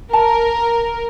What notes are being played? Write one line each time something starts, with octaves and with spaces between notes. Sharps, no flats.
A#4 A5 A#5